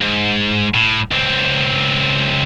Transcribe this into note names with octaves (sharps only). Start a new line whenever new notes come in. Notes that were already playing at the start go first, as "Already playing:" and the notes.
G#2
A2
C#2 C4